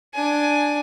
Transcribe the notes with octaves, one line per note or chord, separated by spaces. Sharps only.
D4 G#5